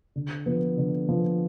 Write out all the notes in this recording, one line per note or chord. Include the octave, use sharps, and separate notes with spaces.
D3
F3 B3
D3
F3 B3